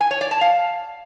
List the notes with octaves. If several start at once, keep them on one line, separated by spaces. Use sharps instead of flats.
G#5
C#5
D5
A5
F5